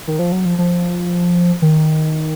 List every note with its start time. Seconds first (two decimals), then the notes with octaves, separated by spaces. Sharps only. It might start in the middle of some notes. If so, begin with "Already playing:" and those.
0.07 D#3
0.19 F3
0.32 F#3
0.45 F3
0.58 F3
1.62 D#3